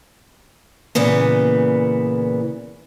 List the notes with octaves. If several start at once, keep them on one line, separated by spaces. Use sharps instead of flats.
A#2 C#3 E3 B3